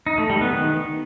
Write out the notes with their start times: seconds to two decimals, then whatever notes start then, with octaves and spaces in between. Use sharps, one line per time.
0.07 D#4
0.18 A3
0.30 G3
0.41 B3
0.53 D#3